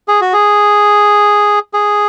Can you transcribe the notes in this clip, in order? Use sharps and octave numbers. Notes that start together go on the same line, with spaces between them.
G#4
F#4
G#4
G#4